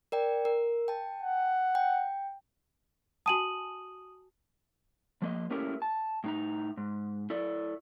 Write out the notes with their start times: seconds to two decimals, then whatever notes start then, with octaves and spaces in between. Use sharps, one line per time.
0.12 A#4 D5 G5
0.45 A#4
0.88 G5 A5
1.23 F#5
1.75 G5
3.26 F#4 G#5 A5 D#6 D#7 F#7
5.22 F3 A#3 D#5
5.51 A3 A#3 C#4 E4 G4 A#4
5.82 A5
6.24 A2 D#4 A#5
6.77 G#2
7.30 E4 A4 D5